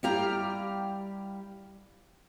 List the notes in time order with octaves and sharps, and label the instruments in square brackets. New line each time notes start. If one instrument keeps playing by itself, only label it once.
[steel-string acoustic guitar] G3 E4 G4 F5 G5 A#5